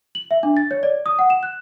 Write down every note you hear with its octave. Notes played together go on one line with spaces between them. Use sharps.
F#7
E5
D4
A6
C#5
D5
D#6
F#5
E7
F#6